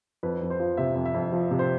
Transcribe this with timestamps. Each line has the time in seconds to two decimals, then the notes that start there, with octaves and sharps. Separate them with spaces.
0.23 F2 B4
0.41 F2
0.50 C5
0.60 F3
0.77 C3 E5
0.95 F2
1.05 E5
1.14 F2
1.32 F3
1.51 C3
1.59 C5